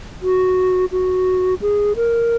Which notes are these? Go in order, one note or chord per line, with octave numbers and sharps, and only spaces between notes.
F#4
F#4
G#4
A#4